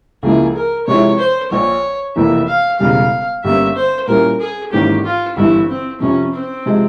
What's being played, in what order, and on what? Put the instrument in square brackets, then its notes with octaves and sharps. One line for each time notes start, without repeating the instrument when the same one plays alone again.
[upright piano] C#2 C#3 F3 A#3 E4 [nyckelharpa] G#4
[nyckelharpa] A#4
[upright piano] C3 F3 G#3 C4 E4 [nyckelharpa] C#5
[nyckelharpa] C5
[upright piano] A#1 A#2 F3 [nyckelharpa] C#5
[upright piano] F1 F2 E3 A#3 [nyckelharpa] E5
[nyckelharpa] F5
[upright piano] E1 E2 C#3 G3 [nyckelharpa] F5
[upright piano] G1 G2 G3 A#3 C#4 [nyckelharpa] E5
[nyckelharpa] C5
[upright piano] A#2 G3 C#4 E4 [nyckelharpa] A#4
[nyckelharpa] G#4
[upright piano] G#1 G#2 E3 A#3 C#4 [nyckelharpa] G4
[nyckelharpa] F4
[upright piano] G1 G2 E3 [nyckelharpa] E4
[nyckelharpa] C4
[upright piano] F2 C3 F3 [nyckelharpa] C#4
[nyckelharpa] C4
[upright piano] C3 F3 G#3